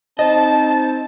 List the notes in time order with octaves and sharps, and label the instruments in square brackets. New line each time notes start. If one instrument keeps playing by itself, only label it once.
[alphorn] C4 [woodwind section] D#4 C5 A5 [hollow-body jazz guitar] D#5